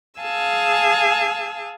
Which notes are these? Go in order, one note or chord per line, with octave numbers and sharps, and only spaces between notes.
G#4 F5 G#5 A5 E6